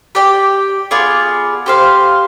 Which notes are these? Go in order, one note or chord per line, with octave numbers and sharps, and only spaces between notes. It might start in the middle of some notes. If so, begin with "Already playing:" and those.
G4 D5 G5
B3 F4 G#4 D5
G4 C5 F5